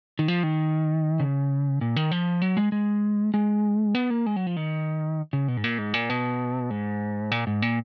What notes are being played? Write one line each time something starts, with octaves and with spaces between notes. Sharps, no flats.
D#3
F3
D#3
C#3
A#2
D#3
F3
F#3
G#3
G#3
G#3
B3
A#3
G#3
F#3
F3
D#3
C#3
B2
G#2
A#2
G#2
A#2
B2
G#2
A#2
G#2
A#2